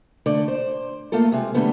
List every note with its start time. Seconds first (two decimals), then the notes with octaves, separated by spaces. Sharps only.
0.26 D3 A3 D5
0.48 C5
1.12 A3 A#3 F4 A4
1.32 C3 G#3
1.54 D3 G3 A3 B3